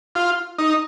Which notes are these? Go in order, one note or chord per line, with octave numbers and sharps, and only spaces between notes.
F4
D#4